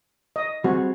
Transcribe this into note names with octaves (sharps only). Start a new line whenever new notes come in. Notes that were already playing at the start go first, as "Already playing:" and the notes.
D#5
G3 C4 F#4 G#4